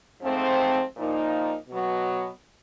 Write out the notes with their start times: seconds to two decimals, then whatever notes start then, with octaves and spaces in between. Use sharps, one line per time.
0.22 G#2 F3 A3 C4
0.96 A#2 F3 A#3 D#4
1.69 B2 F#3 B3